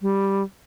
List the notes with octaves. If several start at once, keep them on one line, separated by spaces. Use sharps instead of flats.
G3